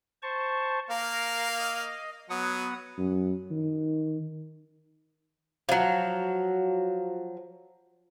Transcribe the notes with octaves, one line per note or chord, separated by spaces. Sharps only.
C5 A5 C#6
A#3 A#4 F5
D#5
F#3 B3 F#5 D#6
F#2
D#3
F3 F#3